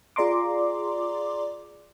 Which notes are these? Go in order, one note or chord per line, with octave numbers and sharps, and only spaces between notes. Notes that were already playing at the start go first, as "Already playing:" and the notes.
F4 G#4 D5 A#5 C6 D6